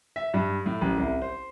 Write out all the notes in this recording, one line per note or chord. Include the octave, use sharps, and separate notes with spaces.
E5
G2
A2
A1
C2
C5